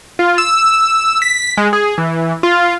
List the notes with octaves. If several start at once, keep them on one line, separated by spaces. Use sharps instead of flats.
F4
E6
B6
G#3
G#4
E3
F4